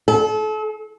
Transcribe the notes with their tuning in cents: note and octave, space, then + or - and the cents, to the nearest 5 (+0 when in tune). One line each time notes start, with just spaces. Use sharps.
A4 -35